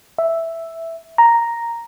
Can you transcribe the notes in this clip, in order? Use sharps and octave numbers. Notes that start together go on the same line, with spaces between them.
E5
A#5